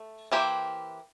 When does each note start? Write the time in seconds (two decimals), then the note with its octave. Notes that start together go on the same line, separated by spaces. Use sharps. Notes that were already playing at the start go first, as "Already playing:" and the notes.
Already playing: A3
0.32 E3 A#3 E4 G4 C5